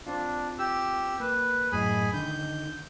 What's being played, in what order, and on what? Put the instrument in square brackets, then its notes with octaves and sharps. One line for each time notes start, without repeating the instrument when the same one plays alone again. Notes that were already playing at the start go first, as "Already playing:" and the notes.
[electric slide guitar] C4 F4 [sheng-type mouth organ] D4
[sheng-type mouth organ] G4 E6
[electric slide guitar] A#3 [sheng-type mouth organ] B4
[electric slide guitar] F#2 A2 D#5 [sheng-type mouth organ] G#4 G#5 B5
[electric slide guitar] D3 D#3 D#4 [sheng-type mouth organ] G6